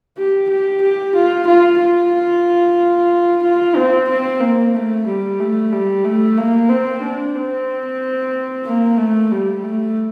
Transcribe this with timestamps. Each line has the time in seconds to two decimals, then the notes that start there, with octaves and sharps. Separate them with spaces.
0.18 G4
0.50 G4
0.82 G4
1.15 F4
1.47 F4
1.80 F4
3.44 F4
3.76 C4
4.09 C4
4.41 A#3
4.74 A3
5.07 G3
5.40 A3
5.72 G3
6.05 A3
6.38 A#3
6.70 C4
7.02 D4
7.35 C4
8.65 A#3
8.98 A3
9.31 G3
9.64 A3